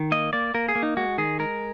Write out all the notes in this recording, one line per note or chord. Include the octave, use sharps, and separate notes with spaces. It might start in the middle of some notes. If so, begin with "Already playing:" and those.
Already playing: D#3
A#3 D#5
A#3 D5
A#3 A#4
G#4
A#3
D#4
G#3 F#4
D#3 G#4
G#3 A#4